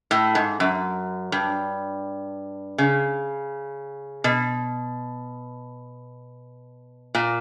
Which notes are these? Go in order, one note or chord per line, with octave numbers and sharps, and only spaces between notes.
A2
G#2
F#2
G2
C#3
B2
A#2